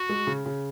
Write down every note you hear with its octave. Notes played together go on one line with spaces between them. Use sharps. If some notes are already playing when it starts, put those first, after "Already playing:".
Already playing: F#4
G#3
C#3
C#3